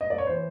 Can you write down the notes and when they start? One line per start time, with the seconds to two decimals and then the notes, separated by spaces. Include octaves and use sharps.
0.01 D#5
0.10 D5
0.18 C#5
0.27 E3 C5